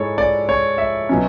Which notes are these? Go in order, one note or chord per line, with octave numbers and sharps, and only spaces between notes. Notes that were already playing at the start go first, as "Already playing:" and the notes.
Already playing: G#2 G#3 E4 A4 C#5
D5
C#5
E5
B2 F#3 C#4